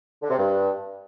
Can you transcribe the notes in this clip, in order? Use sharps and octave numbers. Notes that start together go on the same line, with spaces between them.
D3
C3
G2